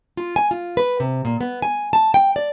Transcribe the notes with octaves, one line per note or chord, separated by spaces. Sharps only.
F4
G#5
F4
B4
C3
A#2
B3
G#5
A5
G5
D5